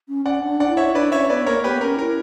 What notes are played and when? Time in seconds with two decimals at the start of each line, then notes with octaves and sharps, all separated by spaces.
0.09 C#4
0.25 C#4 D5 F#5
0.43 D4
0.60 D5 F#5
0.69 E4
0.77 C#5 E5
0.95 D4 B4 D5
1.12 C#4 C#5 E5
1.29 B3 B4 D5
1.46 A#3 A#4 C#5
1.64 B3 G4 B4
1.81 C#4 A#4
1.99 E4 A#4